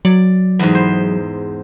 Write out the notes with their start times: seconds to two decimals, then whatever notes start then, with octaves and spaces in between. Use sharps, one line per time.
0.05 F#3 D5
0.59 E2 G#2
0.75 C5